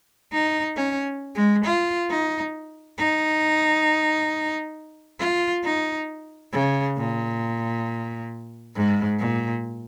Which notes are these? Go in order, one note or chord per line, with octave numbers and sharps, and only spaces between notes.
D#4
C#4
G#3
F4
D#4
D#4
F4
D#4
C#3
A#2
G#2
A#2